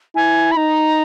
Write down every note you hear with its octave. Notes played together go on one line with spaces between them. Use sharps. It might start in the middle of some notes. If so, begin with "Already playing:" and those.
E4 G#5
B5
D#4 A#5